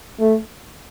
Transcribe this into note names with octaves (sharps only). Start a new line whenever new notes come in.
A3